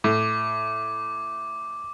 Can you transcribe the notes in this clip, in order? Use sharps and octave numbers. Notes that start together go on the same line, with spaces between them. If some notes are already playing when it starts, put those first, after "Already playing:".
A2 D6